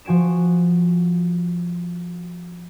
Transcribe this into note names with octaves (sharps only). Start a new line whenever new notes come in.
F3 F#4 G#5 D7 E7